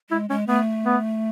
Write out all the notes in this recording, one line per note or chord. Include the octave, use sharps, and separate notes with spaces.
G#3 E4
G#3 C#4
A3 B3
B3